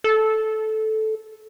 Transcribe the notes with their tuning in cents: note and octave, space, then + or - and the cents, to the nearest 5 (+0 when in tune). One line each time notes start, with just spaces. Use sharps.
A4 -10